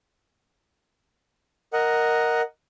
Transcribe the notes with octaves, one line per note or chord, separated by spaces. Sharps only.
A#4 D#5 F#5